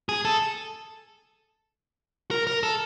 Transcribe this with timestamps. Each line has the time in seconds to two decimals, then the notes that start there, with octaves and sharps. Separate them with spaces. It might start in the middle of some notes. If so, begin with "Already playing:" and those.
0.09 G#4
0.25 A4
2.31 A#4
2.47 A#4
2.63 A4